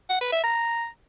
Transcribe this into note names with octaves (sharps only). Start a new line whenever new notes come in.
F#5
B4
E5
A#5